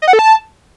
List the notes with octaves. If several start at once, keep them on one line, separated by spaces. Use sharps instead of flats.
D#5
F#5
A4
A5